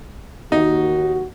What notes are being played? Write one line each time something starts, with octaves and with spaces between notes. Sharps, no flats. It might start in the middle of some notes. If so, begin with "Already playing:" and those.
D#2 D#4 F#4